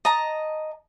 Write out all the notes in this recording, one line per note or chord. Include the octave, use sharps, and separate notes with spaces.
D#5 A5 A#5